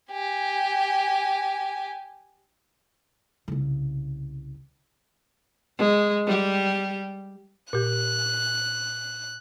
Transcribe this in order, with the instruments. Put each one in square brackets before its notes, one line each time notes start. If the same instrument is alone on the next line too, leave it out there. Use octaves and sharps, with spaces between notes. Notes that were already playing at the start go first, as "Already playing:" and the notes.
[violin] G4 G#5
[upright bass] C2 C#3
[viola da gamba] G#3
G3 G4
[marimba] A#2 G4 [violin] F#6